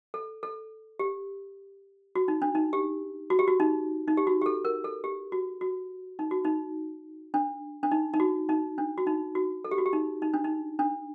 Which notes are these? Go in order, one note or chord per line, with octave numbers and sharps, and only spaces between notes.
A4
A4
G4
F#4
D#4
D4
D#4
G4
F#4
G4
F#4
D#4
D#4
G4
F#4
G4
A4
A#4
A4
G4
F#4
F#4
D#4
F#4
D#4
D4
D4
D#4
D#4
F#4
D#4
D4
F#4
D#4
F#4
A4
G4
F#4
G4
D#4
D#4
D4
D#4
D4